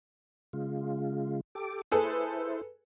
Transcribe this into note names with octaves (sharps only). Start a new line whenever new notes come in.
C#3 G#3 F4
G4 A4 D6
E4 G#4 A4 B4 C5